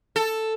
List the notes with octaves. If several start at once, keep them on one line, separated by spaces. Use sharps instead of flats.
A4